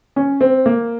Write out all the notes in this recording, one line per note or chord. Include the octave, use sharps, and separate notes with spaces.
C#4
C4
A#3